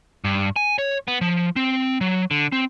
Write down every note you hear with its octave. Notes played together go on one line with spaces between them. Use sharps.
G2
G#5
C#5
B3
F3
C4
F#3
D3
C4